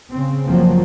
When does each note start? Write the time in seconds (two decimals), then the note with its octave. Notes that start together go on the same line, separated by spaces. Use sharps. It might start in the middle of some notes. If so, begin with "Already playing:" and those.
0.12 C#3 C4
0.47 F#1 F3 F#3 A#3 C4